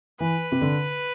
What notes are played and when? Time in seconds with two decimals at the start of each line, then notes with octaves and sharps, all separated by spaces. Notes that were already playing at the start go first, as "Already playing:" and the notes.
0.20 E3 B4
0.52 C3
0.62 D3